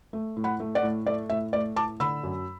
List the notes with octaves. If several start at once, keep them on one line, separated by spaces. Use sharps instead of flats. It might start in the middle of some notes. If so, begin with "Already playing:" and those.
A3
A2
F#5 B5
A3
D5 F#5
A2
A3 D5
A2 E5
A3 D5
A2 A5 D6
D3 B5 E6
F#2